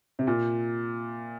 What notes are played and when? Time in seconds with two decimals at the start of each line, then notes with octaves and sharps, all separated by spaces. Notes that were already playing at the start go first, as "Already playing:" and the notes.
0.19 C3
0.27 A#2